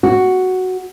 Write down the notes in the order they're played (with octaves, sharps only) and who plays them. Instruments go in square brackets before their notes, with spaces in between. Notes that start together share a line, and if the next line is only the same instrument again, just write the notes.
[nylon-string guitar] F#4